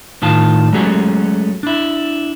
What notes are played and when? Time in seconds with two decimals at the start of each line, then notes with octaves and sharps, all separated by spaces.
0.22 A2 D#3 F4 A5
0.73 F#3 G#3 A3 C#4 F#4 G#4
1.63 D4 E4